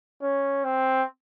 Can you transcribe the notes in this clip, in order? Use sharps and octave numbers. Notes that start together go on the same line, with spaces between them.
C#4
C4